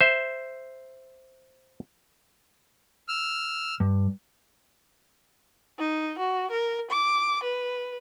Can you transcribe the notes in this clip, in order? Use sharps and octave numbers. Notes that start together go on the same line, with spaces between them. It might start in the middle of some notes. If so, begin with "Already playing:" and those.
C5 E5
E6 F6
G2
D#4
F#4
A#4
D6
B4